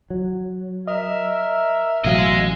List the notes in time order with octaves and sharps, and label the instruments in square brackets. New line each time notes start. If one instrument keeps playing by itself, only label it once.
[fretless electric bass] F#3
[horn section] A#4 E5 [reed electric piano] D#5
[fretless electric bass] A1 F#3 [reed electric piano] B2 F5 [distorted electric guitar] G#4 D#5